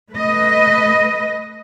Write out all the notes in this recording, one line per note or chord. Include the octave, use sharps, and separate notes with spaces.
A3 B4 D#5